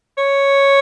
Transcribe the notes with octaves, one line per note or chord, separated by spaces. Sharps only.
C#5